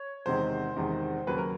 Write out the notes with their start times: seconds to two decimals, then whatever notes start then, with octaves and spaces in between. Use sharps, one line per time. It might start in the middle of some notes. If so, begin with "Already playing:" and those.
Already playing: C#5
0.26 E2 C3 D#3 G#3 C5
0.77 E2 C3 D#3 G#3
1.27 D#2 C#3 F#3 A#3 B4
1.38 A#4